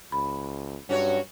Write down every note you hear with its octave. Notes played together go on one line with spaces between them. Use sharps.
C#2 B5
G2 F#3 C#4 F#4 C#5